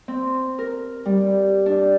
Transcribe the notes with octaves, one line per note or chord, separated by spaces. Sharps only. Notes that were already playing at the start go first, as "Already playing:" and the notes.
C4
A#4
G3
D4